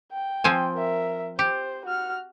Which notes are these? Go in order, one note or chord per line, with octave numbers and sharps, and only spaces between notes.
G5
F3 C4 G#5
A#4 E5
G4 C5
F#4 F6